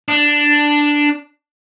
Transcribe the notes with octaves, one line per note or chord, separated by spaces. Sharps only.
D4